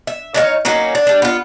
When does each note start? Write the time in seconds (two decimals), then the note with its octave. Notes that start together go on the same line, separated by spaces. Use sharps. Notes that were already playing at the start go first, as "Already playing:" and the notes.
0.07 E5
0.34 D4 D#4 C#5 F5
0.65 F#3 A#3 C#4 D#4
0.95 D4
1.07 G3 D4
1.22 B3 F4